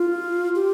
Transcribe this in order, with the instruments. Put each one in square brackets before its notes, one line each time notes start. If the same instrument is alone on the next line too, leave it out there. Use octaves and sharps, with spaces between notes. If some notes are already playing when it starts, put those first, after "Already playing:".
Already playing: [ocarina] F4
G4